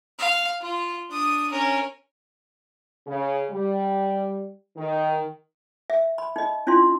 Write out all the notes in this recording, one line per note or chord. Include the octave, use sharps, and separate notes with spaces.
F5
F4
D4 D#6
C#4 A#4
C#3
G3
D#3
E5
B5
D#4 D#5
C#4 D4 E4 F4 C6